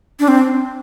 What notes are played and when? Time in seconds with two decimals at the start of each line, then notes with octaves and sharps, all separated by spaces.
0.20 D4
0.28 C4